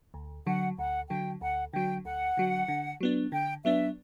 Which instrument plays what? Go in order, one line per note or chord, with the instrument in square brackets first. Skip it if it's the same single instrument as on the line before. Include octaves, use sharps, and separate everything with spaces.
[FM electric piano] D2
[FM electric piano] D3 F#3 [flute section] F#5
[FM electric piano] D2 [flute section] F#5
[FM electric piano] D3 F#3 [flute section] G5
[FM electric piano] D2 [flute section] F#5
[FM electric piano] D3 F#3 [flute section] G5
[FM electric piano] D2 [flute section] F#5
[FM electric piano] D3 F#3
D3
F#3 B3 D4
[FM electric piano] D3 [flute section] G5
[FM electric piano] F#3 B3 D4 [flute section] E5